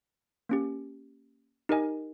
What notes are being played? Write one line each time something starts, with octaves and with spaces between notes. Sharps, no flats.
A#3 C#4 G4
D#4 G4 A#4 D#5 G#5